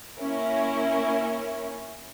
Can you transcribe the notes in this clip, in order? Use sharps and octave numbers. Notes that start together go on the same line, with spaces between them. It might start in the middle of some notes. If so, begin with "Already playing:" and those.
A#3 C#4 E4 A#4